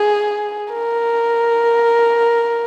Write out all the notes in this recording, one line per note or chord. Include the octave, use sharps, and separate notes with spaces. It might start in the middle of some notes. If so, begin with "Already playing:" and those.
Already playing: G#4
A#4